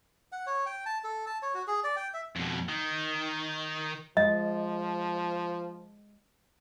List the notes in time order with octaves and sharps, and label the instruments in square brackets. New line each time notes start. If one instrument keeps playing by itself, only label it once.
[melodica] F#5
C#5
G5
A5
A4
A5
C#5
F#4
G#4
D5
G5
E5
[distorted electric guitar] F2 B2
D#3
[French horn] F3 [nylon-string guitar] G#3 [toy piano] D#5